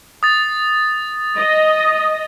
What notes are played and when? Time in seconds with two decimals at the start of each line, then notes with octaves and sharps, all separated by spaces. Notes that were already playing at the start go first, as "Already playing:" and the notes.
0.23 D#6 A6
1.36 D#5